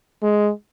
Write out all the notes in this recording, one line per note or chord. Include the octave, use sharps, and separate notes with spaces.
G#3